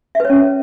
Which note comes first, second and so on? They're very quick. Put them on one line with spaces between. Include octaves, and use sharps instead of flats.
E5 B4 C#5 C#4